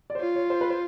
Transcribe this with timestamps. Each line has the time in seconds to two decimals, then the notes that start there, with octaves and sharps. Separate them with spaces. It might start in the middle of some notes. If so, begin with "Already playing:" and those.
0.10 D5
0.15 C5
0.20 F4 C#5
0.36 C#5
0.50 C5
0.61 B4
0.70 C5